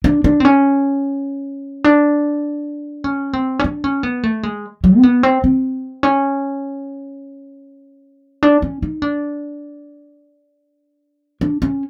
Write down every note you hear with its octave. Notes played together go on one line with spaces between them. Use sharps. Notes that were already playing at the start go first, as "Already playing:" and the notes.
D4
D4
C4
C#4
D4
C#4
C4
C#4
D4
C#4
B3
A3
G#3
F#3
C4
B3
C4
C4
C#4
D4
C#4
D#4
D4
D4
C#4